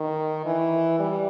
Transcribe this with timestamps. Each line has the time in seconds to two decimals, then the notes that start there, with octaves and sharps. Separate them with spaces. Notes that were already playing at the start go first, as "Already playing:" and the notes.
Already playing: D#3
0.46 E3
0.99 G3